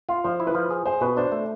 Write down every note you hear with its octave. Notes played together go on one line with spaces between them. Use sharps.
F4 F5
F3 C5
E4
B4
F3
G#4
G#4 C5
B2 B4
D4 C5
A3